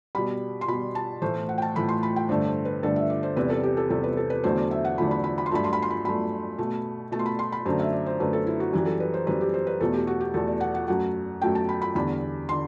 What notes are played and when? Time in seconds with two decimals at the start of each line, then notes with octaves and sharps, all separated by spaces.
0.15 B2 G3 B5
0.61 C6
0.68 B2 G3 B5
0.95 A5
1.22 A2 E3 A3 C5
1.49 F#5
1.58 G5
1.62 A5
1.75 A2 E3 A3 B5
1.89 C6
2.03 B5
2.16 G5
2.29 G2 D3 A3 C5
2.47 C5
2.65 B4
2.83 G2 D3 A3 A4
2.96 E5
3.10 D5
3.23 C5
3.36 E2 C3 G3 B4
3.50 A4
3.63 G4
3.77 A4
3.90 E2 C3 G3 A4
4.04 B4
4.17 A4
4.30 B4
4.44 E2 D3 F#3 A3 C5
4.58 D5
4.71 E5
4.85 F#5
4.98 E2 D3 F#3 A3 B5
5.11 B5
5.24 B5
5.38 B5
5.46 C6
5.51 G2 F#3 A3 B5
5.64 C6
5.73 B5
5.82 C6
5.90 B5
6.05 G2 F#3 A3 B5
6.58 B2 A3
7.12 B2 A3 A5
7.19 C6
7.26 B5
7.39 C6
7.52 B5
7.66 F#2 D3 A3 C5
7.79 E5
7.93 D5
8.06 C5
8.20 F#2 D3 A3 B4
8.33 A4
8.47 E4
8.60 F#4
8.73 F#2 E3 G3 F#4
8.86 A4
9.00 B4
9.14 C5
9.27 F#2 E3 G3 B4
9.41 G4
9.54 C5
9.67 B4
9.81 E2 B2 A3 A4
9.94 G4
10.07 F#4
10.21 G4
10.34 E2 B2 A3 A4
10.47 D5
10.60 F#5
10.74 F#5
10.88 F#2 F#3 A3 F#5
11.42 F#2 F#3 A3 G5
11.55 A5
11.69 B5
11.82 B5
11.95 E2 D3 G3 B5
12.49 D3 C6